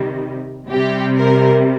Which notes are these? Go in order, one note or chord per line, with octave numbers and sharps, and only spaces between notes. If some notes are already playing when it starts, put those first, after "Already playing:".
Already playing: C3 D#3 G3
C3 G3 G4
A#4